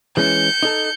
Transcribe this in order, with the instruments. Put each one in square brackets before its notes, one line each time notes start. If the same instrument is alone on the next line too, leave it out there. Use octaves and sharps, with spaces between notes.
[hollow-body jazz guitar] E3 G#3 C#4 [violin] G6 C#7
[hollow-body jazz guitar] D#4 A4